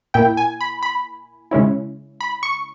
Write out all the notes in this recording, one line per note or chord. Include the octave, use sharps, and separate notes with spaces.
A#2 A#3 E4 G5
G#5
B5
B5
C#3 G#3 C#4 E4
B5
C#6